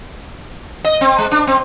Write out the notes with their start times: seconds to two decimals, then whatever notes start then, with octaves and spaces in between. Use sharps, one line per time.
0.85 D#5
1.01 C4
1.18 G#3
1.31 D4
1.47 C4